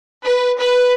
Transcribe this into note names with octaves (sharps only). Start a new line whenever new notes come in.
B4
B4